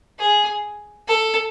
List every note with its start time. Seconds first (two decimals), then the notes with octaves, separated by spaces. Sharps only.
0.19 G#4
1.08 A4